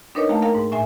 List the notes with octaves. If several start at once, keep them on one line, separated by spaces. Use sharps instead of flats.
D4 D#4 A#4 B4 C#5 D#5
A3 A#3 F5 G5 A5
A#4 F5 G5 A#5
G#2
A2 E5 G#5